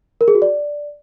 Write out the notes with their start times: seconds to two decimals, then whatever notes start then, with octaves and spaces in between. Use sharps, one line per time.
0.21 A#4
0.28 G#4
0.35 F#4
0.42 D5